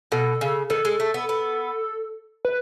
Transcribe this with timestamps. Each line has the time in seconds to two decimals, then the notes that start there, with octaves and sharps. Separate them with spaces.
0.12 B2 A4
0.41 C#3
0.70 D#3 A4
0.85 G#3
1.00 A3
1.14 B3
1.29 B3
2.45 B4